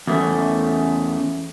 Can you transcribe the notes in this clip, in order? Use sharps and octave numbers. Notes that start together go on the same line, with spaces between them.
E2 A3 C#4